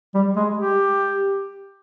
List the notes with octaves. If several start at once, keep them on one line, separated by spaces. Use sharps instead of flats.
G3
G#3
G4